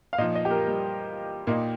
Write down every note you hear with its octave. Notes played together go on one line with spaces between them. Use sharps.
F5
A#2 F3 D#4 D#5
D#5
G4
A#4
G3
A#2 A#3 D#4